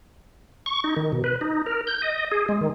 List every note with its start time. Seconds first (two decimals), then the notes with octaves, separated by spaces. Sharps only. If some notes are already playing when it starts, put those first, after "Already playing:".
0.66 C#6
0.84 D#4
0.96 D#3
1.12 B2
1.24 B4
1.41 D#4
1.66 A#4
1.87 G6
2.02 D#5
2.31 G#4
2.49 G#3
2.61 D#3